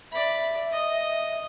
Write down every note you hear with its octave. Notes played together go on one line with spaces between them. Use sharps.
D5 E5 B5
D#5